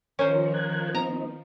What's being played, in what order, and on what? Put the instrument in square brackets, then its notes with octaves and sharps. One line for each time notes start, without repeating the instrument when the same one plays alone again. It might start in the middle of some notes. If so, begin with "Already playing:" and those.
[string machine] D#3 F3 [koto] C#4 C5 [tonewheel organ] A#4 C#5
[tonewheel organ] A#4 F#6 G#6
[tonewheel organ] B3 C4 D#4 [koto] A#5